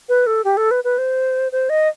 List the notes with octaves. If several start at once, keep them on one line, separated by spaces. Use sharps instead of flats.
B4
A4
G4
A4
B4
B4
C5
C5
D#5